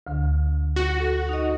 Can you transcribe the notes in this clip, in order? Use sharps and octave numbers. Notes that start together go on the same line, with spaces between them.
D2 D3
F#4
A4
D#4 D#5